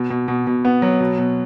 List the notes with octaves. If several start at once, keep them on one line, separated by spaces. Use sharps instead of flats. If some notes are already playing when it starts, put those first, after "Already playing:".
Already playing: B2
B2
B2
B2
B3
F#3
B2
B2